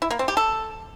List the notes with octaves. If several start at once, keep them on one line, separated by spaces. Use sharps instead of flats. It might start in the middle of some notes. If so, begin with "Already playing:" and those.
E4
A#3
C4
G4
A4